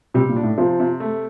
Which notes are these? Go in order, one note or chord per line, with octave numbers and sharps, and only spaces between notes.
C3 G3
A#2
D4
A2
C3 F3
C3
A3